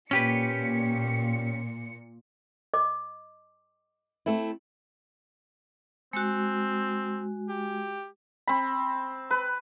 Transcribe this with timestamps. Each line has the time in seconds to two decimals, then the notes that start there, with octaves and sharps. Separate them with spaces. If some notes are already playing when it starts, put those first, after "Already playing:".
0.11 A#2 C#4 G4 B4 C#7
2.74 D#5 D6
4.26 A3 C4 E4
6.13 G#3 C4 F#4
7.49 G4
8.47 C4 B5
9.31 B4